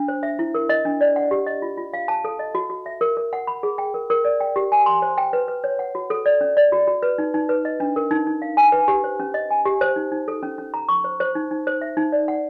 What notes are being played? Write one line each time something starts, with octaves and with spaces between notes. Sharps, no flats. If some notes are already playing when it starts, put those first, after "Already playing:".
Already playing: D4
C5
E5
E4
A#4
D#5
D4
D5
F#5
G4
D#5
F4
F4
F5
A5
A4
D#5
F#4
F#4
E5
A#4
A#4
F#5
B5
G#4
G5
A#4
A#4
D5
G5
G4
G#5
C6
C5
G5
B4
B4
C#5
F#5
F#4
A4
D5
C#4
D5
F#4
F#4
B4
D#4
D#4
B4
D#5
D4
A#4
D#4
D#4
F5
G#5
B4
G4
C5
C#4
D#5
G#5
G4
C5
D#4
D#4
A4
C#4
C#4
A#5
C#6
C5
C5
D#4
D#4
C5
E5
D#4
D5
F#5